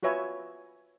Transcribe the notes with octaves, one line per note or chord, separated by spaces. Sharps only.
F4 F#4 B4 C#5 E5 G#5